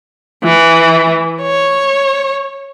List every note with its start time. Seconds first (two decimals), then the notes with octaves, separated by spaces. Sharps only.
0.43 E3
1.42 C#5